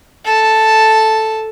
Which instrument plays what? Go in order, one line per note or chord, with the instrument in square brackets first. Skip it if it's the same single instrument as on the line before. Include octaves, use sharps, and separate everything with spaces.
[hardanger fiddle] A4 A5